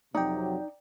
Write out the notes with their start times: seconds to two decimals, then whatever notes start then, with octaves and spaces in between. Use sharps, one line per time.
0.15 F2 C3 F#3 D#4 D5 G5